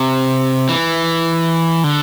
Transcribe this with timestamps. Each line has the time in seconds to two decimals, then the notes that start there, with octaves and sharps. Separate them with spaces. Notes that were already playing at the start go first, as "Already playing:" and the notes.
Already playing: C3
0.69 E3
1.84 D3